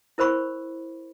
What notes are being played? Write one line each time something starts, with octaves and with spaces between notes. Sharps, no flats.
E4 A#4 C5 B5 C#6